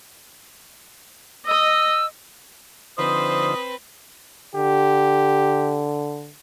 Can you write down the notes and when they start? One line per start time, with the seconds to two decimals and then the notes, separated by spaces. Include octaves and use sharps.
1.47 D#5 E6
2.98 D3 F3 C4 D#4 B4 C5 D#6
4.55 D3 G4